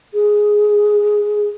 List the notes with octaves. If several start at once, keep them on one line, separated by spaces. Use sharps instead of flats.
G#4